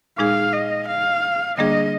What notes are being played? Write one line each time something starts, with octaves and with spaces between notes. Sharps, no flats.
A#2 G#3 D#4 G#4 F5
D#5
F5
D3 G3 A#3 D4 G#4 D#5